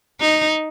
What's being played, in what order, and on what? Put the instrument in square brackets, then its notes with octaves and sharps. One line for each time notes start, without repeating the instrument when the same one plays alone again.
[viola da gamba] D#4